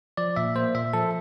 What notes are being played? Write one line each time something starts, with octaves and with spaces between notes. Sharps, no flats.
F3 D5
A#2 E5
A#3 C5
A#2 E5
F3 A4